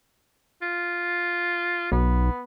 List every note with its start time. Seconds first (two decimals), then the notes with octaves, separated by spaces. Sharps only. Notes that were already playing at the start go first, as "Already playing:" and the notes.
0.62 F4
1.92 B1 B3